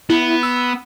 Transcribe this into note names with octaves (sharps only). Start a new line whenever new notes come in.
B3 E4
E6